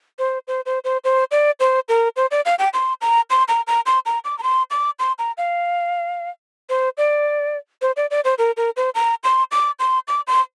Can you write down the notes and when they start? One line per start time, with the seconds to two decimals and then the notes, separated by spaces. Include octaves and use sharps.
0.19 C5
0.48 C5
0.66 C5
0.84 C5
1.04 C5
1.31 D5
1.60 C5
1.89 A#4
2.16 C5
2.31 D5
2.45 F5
2.59 G5
2.74 C6
3.01 A#5
3.30 C6
3.48 A#5
3.67 A#5
3.86 C6
4.06 A#5
4.25 D6
4.38 A#5
4.43 C6
4.71 D6
4.99 C6
5.19 A#5
5.38 F5
6.69 C5
6.98 D5
7.82 C5
7.97 D5
8.11 D5
8.24 C5
8.38 A#4
8.57 A#4
8.77 C5
8.95 A#5
9.24 C6
9.51 D6
9.79 C6
10.08 D6
10.27 C6